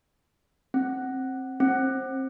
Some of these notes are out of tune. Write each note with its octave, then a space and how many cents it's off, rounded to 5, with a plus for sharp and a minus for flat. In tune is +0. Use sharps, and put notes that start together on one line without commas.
C4 +20
C4 +25